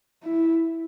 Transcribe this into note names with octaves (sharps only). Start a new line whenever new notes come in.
E4